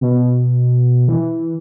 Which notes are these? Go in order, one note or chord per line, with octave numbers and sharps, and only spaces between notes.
B2
E3